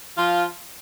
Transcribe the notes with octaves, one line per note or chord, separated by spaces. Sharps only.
F3 F4